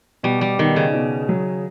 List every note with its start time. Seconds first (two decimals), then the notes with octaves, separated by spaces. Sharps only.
0.23 B2 G3
0.41 G3
0.58 B2 D#3
0.76 C#3
0.93 B2
1.29 F#3